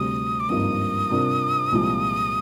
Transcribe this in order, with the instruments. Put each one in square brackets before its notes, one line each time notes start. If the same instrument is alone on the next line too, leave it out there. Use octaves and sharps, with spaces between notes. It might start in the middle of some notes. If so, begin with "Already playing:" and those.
Already playing: [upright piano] D2 C3 G3 [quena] D#6
[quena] D6
[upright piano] G#1 G2 F3 A#3 D#4 [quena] D#6
[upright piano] C3 G3 D4 F4 A#4
C2 A#2 F3 G#3